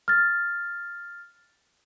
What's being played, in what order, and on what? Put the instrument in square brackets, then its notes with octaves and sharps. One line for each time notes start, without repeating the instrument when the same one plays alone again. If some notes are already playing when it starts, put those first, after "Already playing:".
[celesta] F6 A6